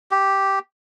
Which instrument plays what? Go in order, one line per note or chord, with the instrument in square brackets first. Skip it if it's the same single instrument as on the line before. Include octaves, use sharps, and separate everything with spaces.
[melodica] G4